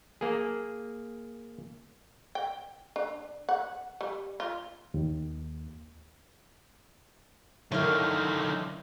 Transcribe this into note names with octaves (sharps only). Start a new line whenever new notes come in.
A#3 G#4
G5
D4
F#5
G3
F4
D#2
D3 D#3 F#3 E4 A#4 C#5 F5